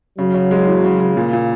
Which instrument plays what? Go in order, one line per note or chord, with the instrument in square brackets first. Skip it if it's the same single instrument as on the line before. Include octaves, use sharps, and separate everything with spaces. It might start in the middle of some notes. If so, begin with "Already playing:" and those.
[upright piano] C#3 [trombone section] F#3
[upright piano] C#3
G#3
E3
C#3
C#3
[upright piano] A#2 [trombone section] A#3
[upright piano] A#2